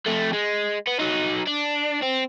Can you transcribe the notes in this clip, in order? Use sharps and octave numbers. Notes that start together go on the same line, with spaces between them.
F2 A3
G#3
B3
F#3 D#4
D4
C4